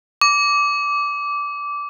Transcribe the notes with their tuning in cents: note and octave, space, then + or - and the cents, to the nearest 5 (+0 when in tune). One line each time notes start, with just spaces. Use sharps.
D6 -15